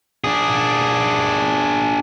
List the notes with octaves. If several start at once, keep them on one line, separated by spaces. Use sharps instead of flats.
D4 G#4